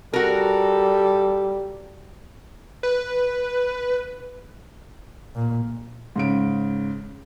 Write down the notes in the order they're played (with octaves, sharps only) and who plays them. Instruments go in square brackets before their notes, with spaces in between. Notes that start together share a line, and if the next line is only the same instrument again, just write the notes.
[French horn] G3 [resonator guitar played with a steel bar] F#4 A#4 [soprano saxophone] A4
[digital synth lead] B4
[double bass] A#2
[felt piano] G#2 C#3 D7